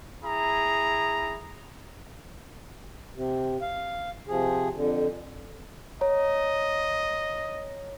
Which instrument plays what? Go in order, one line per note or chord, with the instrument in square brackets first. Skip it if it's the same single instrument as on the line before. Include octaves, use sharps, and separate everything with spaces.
[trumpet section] E4 G#4 A#5
[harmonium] C3
F5
C3 F3 G#4
F2 D3
[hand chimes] C#5 A#5 [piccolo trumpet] D#5